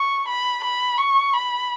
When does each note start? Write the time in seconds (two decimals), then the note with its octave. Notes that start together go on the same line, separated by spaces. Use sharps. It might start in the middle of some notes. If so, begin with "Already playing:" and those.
Already playing: C#6
0.28 B5
0.64 B5
0.98 C#6
1.33 B5